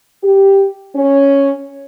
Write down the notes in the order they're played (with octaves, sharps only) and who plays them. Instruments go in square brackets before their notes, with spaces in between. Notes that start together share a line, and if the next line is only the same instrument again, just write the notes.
[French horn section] G4
C#4